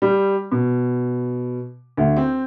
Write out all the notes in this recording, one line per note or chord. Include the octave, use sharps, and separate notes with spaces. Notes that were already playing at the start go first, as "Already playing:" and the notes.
G3
B2
D2
C4